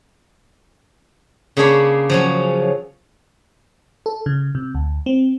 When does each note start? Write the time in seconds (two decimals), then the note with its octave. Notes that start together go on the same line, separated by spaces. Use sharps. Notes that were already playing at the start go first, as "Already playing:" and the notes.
1.57 C#3 A#3 D4 G#4 C#5 B5
2.10 F3 F#3 C#4
4.06 A4
4.26 C#3
4.55 C3
4.75 D2
5.06 C4